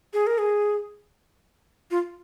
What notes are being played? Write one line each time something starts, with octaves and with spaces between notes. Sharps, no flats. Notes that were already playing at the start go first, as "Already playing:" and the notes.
G#4
A#4
G#4
F4